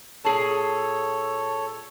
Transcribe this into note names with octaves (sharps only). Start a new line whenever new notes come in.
A#2 G#4 A4 C#5 A5